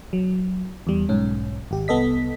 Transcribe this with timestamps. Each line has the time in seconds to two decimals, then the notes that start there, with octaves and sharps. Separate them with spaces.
0.13 F#3
0.87 E2 G3
1.09 B1 G#2 C#4
1.71 G#1 G4
1.88 C2 B3 A4 D#5 B6